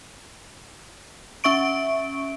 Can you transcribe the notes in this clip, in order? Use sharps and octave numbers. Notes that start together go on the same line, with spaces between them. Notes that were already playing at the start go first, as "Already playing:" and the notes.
C#4 E5 C#6 D7